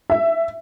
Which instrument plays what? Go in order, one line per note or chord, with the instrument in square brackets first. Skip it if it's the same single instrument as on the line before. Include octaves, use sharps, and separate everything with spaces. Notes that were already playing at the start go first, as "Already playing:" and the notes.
[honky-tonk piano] E5